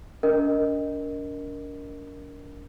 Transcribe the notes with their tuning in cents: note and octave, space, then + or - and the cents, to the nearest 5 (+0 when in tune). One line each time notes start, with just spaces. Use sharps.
D4 -45 A#4 +0 D#5 +0